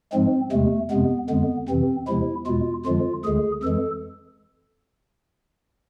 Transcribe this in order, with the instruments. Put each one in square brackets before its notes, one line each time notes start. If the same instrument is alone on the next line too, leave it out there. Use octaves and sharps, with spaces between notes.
[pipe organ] G#2 F3 G#3 C4
E2 C3 G#3 A3
F2 C3 G#3 B3
F2 D3 G#3 B3
F2 C3 E3 C4
E2 C3 F3 G#3 E4
E2 B2 G#3 F4
F2 D3 F3 G#3 F4
D2 D3 G#3 G#4
F2 E3 G#3 A4